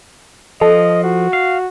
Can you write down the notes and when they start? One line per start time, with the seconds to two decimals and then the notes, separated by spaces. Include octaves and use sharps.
0.61 F3 A4 D#5
1.04 F#4
1.33 F5